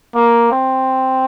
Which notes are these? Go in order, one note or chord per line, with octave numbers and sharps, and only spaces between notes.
A#3
C4